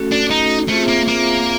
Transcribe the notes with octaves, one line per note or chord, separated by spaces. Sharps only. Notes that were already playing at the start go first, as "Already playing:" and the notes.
Already playing: A3 C#4 F#4 A4
D4
D#4
A3 C4 F4 G#4 C5 E5
A#3
A#3